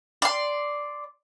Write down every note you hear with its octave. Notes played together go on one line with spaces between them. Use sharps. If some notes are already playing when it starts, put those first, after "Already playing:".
D5 C6